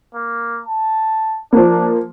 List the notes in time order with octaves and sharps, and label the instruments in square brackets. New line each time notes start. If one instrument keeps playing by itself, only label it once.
[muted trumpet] A#3
A5
[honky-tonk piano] F3 A#3 [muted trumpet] D4